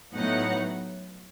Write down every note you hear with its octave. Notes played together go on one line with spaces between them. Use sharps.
A2 F#3 B3 D#4 F#5